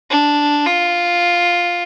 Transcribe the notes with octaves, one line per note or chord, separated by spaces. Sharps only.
D4
F4